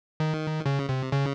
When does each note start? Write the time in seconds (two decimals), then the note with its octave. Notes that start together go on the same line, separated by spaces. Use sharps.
0.20 D#3
0.66 C#3
0.89 C3
1.12 C#3